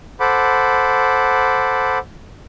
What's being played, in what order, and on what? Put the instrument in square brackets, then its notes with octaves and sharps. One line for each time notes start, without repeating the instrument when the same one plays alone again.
[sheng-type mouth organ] A4 C5 F#5 B5 D6